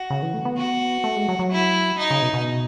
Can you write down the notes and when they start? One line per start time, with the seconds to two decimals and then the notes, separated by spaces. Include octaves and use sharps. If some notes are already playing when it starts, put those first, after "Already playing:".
Already playing: F#4
0.10 C#3
0.23 E3
0.34 A3
0.45 B3
0.57 F#4
1.04 A3
1.16 G#3
1.28 F#3
1.39 F#3
1.52 E4
1.98 D#4
2.10 C#3
2.22 B2
2.33 B2